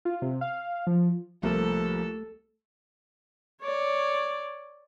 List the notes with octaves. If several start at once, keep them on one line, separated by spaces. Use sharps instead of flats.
F4
C3
F5
F3
C2 F3 A3 A#3 A4 A#4
C#5 D5